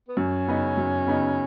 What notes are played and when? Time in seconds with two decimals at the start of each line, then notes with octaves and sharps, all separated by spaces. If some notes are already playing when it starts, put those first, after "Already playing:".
0.09 B3
0.17 F#2 C#4
0.47 C#3 B3 D#4
0.77 F#2
1.07 C#3 B3 D#4